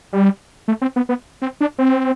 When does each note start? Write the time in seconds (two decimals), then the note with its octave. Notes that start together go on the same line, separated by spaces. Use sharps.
0.13 G3
0.68 A3
0.81 C4
0.96 B3
1.09 B3
1.42 C4
1.61 D4
1.78 C4